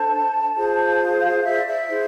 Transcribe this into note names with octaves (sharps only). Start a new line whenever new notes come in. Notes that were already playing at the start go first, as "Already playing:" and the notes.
Already playing: D4 A4 C5 A5
F4 G#4 C5
F5
E5
D5
E5
E4 G#4 C5